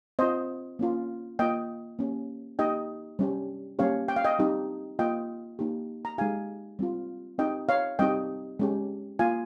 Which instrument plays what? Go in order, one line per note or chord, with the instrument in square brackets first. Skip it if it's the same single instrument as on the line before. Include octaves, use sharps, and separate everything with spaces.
[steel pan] C4 F4 C5 D#5
A#3 C#4 F4
A#3 F4 D#5 G5
A#3 C#4 G4
A#3 D#4 G4 D#5 G5
G3 C#4 G4
G3 A#3 C#4 G4 C#5 F5
G5
F5
D#5 G5
G3 C4 D#4 G4
A#3 F4 D#5 G5
A#3 D#4 G4
A#5
G#3 D#4 G4 F5 G#5
G3 C4 F4
C4 D#4 G4 D#5 G5
C#5 F5
G3 C4 D#4 G4 D#5 G5
G#3 C#4 G4
A#3 F4 F5 G#5